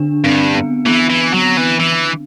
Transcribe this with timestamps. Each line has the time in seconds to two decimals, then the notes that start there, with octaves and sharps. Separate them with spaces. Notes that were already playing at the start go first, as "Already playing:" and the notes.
Already playing: D3 D4
0.24 G2 C4
0.55 B3
0.86 E3 B3
1.10 E3
1.33 F#3
1.57 E3
1.80 E3